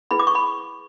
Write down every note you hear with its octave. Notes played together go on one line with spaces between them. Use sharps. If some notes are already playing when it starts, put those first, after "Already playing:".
E4 G#4 B4 B5
D6
C#6
B5